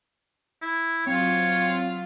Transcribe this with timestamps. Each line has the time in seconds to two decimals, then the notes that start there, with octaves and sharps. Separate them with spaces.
0.62 E4
1.07 F#3 C4 F4 C#5